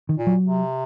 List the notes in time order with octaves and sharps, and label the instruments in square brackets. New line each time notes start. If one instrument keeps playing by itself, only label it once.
[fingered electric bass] D#3
[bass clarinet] A#2
[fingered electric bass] F#3
[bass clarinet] C3